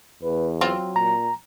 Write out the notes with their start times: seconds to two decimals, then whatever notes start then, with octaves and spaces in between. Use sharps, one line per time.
0.23 E2 B4
0.61 F#3 C4 F4
0.96 A#2 A#5